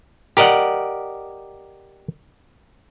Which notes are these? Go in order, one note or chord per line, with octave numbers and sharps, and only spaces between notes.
G4 A#4 D5 D#5 F#5